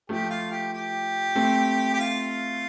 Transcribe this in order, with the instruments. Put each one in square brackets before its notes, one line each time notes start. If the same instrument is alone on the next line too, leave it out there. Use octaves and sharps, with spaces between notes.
[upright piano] F3 A3 [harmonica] G4
[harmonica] F4
G4
G4
[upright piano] A3 C4
[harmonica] G4
F4